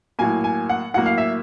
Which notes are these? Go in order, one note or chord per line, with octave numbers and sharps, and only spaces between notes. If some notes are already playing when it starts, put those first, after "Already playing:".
A2 F#3 A#3 G#5
G#5
F#5
A2 F#3 A#3 F#5
F5
E5